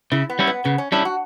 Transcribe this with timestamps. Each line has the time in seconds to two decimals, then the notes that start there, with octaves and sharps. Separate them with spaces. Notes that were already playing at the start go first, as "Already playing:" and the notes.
0.12 C#3 E4
0.30 B3
0.39 G3 C#4 E4
0.47 B3
0.65 C#3 B3
0.78 C#4
0.92 G3 C#4 D4 E4
1.05 F#4